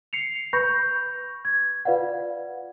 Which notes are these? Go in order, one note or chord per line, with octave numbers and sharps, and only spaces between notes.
C7 C#7 F7
B4 B5 C#6 G6 A#6
G#6
F4 B4 D5 F5 F#5